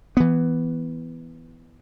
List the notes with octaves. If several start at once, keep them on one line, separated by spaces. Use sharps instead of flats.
E3 B3